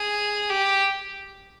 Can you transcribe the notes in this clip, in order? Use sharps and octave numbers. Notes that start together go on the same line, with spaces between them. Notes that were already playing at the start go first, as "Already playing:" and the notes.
Already playing: G#4
G4